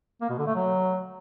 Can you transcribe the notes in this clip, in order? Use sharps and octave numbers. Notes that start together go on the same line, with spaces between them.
A#3
B2
D3
A3
F#3